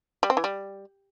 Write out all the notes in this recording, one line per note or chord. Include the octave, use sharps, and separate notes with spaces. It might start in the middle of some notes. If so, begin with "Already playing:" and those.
G3
C4
E3
G3